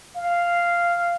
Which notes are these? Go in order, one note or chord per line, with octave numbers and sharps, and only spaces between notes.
F5